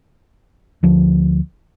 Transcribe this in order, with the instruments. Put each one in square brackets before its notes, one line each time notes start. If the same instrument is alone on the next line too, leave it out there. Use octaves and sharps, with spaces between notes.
[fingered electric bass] D2 F3